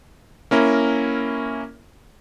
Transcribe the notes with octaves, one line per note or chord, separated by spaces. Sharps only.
A#3 C#4 E4 A#4